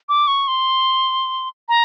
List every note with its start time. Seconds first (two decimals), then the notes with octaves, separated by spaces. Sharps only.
0.09 D6
0.27 C#6
0.48 C6
1.69 A#5